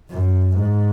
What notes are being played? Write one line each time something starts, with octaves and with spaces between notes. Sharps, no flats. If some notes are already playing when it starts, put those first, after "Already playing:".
F#2
G#2